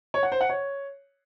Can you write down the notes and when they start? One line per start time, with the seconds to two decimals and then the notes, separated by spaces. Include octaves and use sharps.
0.14 C#5
0.23 F#5
0.32 C5
0.41 F#5
0.49 C#5